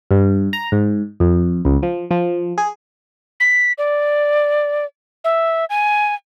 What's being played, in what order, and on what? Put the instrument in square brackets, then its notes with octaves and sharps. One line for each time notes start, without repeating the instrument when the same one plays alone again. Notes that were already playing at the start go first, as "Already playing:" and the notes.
[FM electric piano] G2
A#5
G#2
F2
C#2
F3
F3
G#4
[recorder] B6
D5
E5
G#5